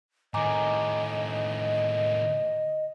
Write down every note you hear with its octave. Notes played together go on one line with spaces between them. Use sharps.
A2 D#3 D#5 G#5 A#5 D6